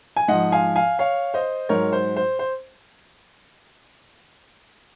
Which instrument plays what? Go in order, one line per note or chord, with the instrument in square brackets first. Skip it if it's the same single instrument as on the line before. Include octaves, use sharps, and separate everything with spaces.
[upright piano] G#5
G#2 F3 D#5 F#5
F5 G#5
F5 G#5
C#5 F5
C5 D#5
G#2 F#3 A#4 C#5
C5
C5
C5